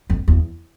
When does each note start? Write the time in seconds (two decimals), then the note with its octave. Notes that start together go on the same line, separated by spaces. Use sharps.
0.10 F2
0.28 E2